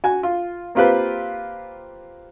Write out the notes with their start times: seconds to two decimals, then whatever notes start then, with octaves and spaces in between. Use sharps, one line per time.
0.04 F#4 G#5
0.23 F4
0.75 A#3 C4 F4 G4 B4 C5